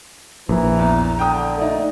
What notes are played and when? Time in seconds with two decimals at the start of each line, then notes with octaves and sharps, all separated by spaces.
0.49 A#1 E3 A#5
0.79 E2
1.19 D3 G5 D#6
1.57 A3 D#4 D5